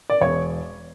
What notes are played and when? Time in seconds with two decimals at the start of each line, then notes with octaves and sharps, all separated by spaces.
0.10 D5
0.21 E1 C#5